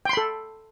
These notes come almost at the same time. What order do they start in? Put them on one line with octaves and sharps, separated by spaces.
G5 C6 B5 A4